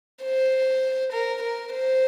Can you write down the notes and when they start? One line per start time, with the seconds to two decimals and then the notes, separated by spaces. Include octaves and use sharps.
0.23 C5
1.13 A#4
1.43 A#4
1.73 C5